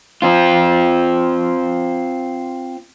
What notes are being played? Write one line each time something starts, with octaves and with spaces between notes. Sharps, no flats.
C4 F4